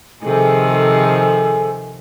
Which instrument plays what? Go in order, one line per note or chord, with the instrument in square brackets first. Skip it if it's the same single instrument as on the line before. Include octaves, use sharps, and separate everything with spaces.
[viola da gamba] C3 D#3 F3 [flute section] G#4 A4 G#5